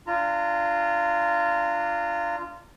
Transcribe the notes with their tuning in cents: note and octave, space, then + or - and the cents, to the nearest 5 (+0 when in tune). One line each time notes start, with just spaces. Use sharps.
D4 +0 F4 -15 A#5 -30